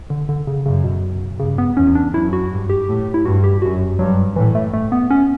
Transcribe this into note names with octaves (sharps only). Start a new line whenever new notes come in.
D3
D3
C#3
F#2 C#3
B2
G2 C#3
B3
E2 C#4
D4
F#2 E4
F#4
G2
G4
A2
E4
G2 F#4
G4
F#2 F#4
G2 F#3
A2 E3
A3
A3
B3
C#4